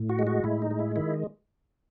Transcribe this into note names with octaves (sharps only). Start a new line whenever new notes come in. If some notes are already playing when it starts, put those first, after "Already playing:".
Already playing: A2
F#4
G#3
F#4
A2 E4
D#4
G#3
E4
D#3 E4